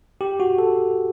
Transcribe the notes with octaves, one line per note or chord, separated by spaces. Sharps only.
G4
F#4
A4